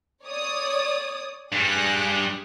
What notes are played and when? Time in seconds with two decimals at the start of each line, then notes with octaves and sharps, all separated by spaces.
0.24 C#5 D5 D#6
1.52 G2 G3 G#4 D#6 F#6